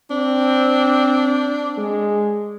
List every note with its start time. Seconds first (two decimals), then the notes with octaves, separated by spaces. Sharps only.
0.10 C4 D4
1.77 G#3